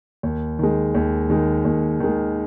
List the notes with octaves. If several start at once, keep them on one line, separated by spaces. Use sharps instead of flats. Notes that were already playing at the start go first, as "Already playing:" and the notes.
D#2
D#3 G#3
D#2
D#3 G#3
D#2
D#3 G#3